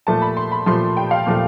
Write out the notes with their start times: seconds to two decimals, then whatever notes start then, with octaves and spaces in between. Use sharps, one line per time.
0.07 A#2 F3 A3 A5
0.22 B5
0.37 C6
0.52 B5
0.66 A#2 F3 A3 C6
0.97 G5
1.11 F5
1.27 A#2 F3 A3